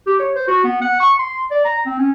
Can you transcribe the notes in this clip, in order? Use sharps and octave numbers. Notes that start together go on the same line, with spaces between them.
G4
C#5
C5
F#4
B3
F#5
C#6
C6
D5
A#5
C4
C#4